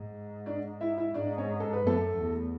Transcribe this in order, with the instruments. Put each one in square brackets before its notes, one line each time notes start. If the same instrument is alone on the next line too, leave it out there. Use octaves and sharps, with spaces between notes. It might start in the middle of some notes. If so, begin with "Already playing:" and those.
Already playing: [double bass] G#2
[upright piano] D4 D5
E4 E5
E4 E5
[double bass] G#2 [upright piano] D4 D5
[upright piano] C#4 C#5
A4
B4
[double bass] F#2 [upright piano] A3 A4
[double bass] E2